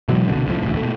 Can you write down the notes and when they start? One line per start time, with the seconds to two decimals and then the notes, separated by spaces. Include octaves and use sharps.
0.08 B2 E3 F#3 G#3
0.27 F1 C2 B2 D3
0.47 C2 A2 F3
0.63 E1 A1 D2
0.77 B2 A3